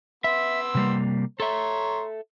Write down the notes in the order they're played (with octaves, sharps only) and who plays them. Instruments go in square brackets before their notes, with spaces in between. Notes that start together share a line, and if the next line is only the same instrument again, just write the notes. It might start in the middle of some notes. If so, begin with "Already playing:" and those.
[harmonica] B3 C6 E6 [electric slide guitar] E5
[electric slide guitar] C3 G3 A#3
[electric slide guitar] A4 E5 [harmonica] C#5 A#5 C6